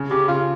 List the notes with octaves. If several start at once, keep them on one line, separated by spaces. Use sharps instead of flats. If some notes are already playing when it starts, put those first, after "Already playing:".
Already playing: C#3
C#3 G4
C#3 F4